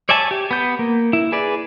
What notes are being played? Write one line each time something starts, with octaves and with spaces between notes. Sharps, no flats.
C#5 D5 E5 G#5 A5
G4
B3 G6
A#3
E4
G#4 B4 D5